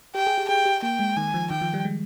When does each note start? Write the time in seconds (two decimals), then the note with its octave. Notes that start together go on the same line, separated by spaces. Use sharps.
0.15 G4 G5
0.27 G#4
0.38 G4
0.48 G#4 G5
0.65 G4
0.83 A#3 G5
0.99 G#3
1.17 D#3 G#5
1.34 F3
1.50 D#3 G5
1.61 F3
1.74 G3
1.85 G#3